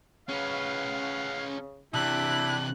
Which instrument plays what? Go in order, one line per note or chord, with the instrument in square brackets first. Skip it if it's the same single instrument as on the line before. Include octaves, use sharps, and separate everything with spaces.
[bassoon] C#3 [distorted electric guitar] C#4 B4 [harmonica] F5 F#5
[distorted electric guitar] C3 E3 [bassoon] D4 [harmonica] E4 G4 E5 [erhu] F#6